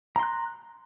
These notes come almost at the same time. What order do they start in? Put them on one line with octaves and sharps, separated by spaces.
A#5 C6 F#6